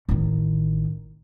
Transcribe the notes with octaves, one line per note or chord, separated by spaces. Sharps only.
A1 D#3